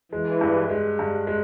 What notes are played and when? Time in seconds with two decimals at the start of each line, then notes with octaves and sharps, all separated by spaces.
0.12 E3 G#3
0.41 G2
0.69 G#3
0.99 G2
1.27 G#3